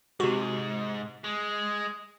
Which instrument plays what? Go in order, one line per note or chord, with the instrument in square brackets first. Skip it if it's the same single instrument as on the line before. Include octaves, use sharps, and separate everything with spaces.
[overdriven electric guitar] G#2 [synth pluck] C3 F#4
[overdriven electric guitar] G#3